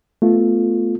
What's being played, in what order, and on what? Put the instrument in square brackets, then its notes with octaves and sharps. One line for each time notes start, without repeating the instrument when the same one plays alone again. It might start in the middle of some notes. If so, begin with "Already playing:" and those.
[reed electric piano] A3 B3 F4